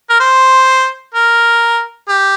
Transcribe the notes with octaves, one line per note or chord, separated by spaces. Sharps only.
A#4
C5
A#4
G4